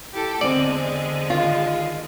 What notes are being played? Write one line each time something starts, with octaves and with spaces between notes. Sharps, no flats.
E4 G4 A4
E2 D3 G#3 C4 C5 D5
D#3 F4